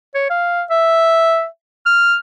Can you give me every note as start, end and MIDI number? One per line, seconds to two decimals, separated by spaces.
0.15 0.30 73
0.30 0.63 77
0.70 1.45 76
1.86 2.16 89